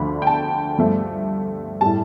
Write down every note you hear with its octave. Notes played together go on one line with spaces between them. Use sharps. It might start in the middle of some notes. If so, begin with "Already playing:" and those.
Already playing: D2 D3 F3 A3 B5
G5
A5
G2 F3 A3
A2 G3 A5